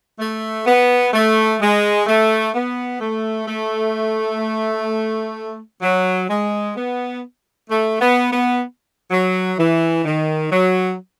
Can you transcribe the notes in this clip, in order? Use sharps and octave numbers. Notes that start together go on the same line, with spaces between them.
A3
B3
A3
G#3
A3
B3
A3
A3
F#3
G#3
B3
A3
B3
B3
F#3
E3
D#3
F#3